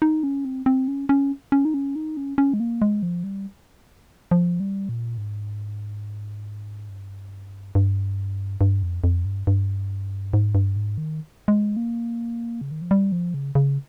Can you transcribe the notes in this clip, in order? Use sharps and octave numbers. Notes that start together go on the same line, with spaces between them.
D#4
C#4
C4
C4
C#4
C#4
C#4
D#4
C#4
D#4
C#4
C#4
G#3
A#3
G#3
F3
G3
F3
G3
A#2
G#2
G2
G2
G2
F2
F2
G2
G2
G#2
G2
G#2
D#3
G#3
A#3
C#3
D#3
F3
G3
F3
C#3
C#3